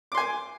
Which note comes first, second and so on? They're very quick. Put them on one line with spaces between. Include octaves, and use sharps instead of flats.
D6 C6 G#5